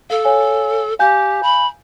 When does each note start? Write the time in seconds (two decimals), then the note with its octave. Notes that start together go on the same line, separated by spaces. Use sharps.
0.10 A4 F5
0.25 C#5 F5 G#5
0.99 G4 F5 G#5 G6
1.43 B5